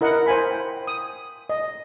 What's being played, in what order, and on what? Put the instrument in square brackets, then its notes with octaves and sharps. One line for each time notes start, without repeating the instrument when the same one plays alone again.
[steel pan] E4 A#4 D#5 F#5
C5 F5 G#5 B5
G5
D#6
D#5